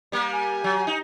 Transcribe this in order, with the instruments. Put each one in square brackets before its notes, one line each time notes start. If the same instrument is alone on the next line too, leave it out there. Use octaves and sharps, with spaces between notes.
[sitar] G3 A#3
[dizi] G#5
[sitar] F#3
D#4